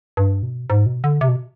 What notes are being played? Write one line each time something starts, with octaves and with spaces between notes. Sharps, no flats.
G2
B2
G#2
B2
D3
C3
B2